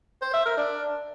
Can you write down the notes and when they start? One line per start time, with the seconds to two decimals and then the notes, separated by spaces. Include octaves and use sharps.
0.22 C5
0.34 E5
0.46 A#4
0.57 D4